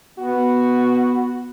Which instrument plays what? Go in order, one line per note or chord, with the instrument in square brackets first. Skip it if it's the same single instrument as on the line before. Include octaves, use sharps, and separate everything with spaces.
[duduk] B3 [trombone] F#4